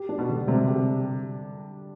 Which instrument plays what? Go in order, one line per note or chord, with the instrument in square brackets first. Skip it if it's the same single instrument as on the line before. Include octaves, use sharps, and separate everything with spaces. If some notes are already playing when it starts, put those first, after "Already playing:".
Already playing: [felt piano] G4
D4
[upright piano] B2
[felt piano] D3
[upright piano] C3 [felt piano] G3
[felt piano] G4